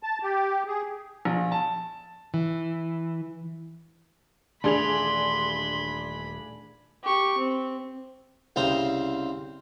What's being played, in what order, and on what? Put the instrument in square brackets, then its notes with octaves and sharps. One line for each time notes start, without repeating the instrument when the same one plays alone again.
[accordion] A5
G4
G#4
[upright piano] A#1
A5
[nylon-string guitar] E3
[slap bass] D#1 E3 A3 [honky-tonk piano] D4 G#4 F7 [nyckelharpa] B5 [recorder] C6
[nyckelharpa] G4 C#6
C4
[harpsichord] C2 C#3 C4 A#5 C6